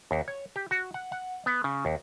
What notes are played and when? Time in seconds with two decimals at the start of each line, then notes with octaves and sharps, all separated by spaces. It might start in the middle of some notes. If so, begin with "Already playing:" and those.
0.11 D#2
0.28 C#5
0.56 G4
0.71 F#4
0.94 F#5
1.12 F#5
1.46 B3
1.64 C#3
1.85 D#2